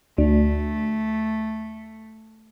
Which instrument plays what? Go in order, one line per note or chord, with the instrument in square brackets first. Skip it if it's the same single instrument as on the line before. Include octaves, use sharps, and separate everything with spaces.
[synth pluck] D2 [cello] A3